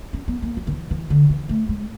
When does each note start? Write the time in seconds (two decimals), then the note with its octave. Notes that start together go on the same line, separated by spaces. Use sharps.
0.13 C#4
0.28 B3
0.42 A#3
0.57 F#3
0.67 D#3
0.72 E3
0.91 E3
1.10 D3
1.30 E3
1.49 A3
1.69 G#3